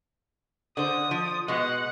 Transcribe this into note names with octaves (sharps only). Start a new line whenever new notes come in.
D3 C5 D#6
F3
B2 G#3 F#5